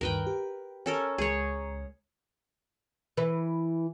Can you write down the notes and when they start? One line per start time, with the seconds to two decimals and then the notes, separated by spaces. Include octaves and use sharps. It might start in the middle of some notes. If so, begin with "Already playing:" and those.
0.01 D2 G2 D#3 A#4 B4 G5
0.27 G4
0.86 C#4 A4 A#4
1.18 C#2 G#3 G#4 C#5 A#5
3.17 E3 B4